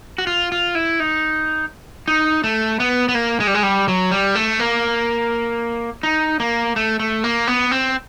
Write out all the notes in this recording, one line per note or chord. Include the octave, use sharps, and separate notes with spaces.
F#4
F4
F4
E4
D#4
D#4
A3
B3
B3
A#3
G#3
G3
G#3
G3
F#3
G3
A3
A#3
D#4
A#3
A3
A3
A#3
B3
C4